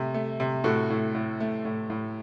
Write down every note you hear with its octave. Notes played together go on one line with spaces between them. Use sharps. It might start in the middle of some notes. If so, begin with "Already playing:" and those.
Already playing: C3 A3
A3
C3
A2 F#4 A4
A2
A2
A3
A2
A2